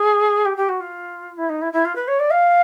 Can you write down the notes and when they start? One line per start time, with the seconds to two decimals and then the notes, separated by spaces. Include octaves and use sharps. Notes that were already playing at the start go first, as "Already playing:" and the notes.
Already playing: G#4
0.45 G4
0.57 G4
0.68 F#4
0.80 F4
1.37 E4
1.49 D#4
1.61 E4
1.73 E4
1.85 F4
1.95 B4
2.07 C#5
2.19 D5
2.30 F5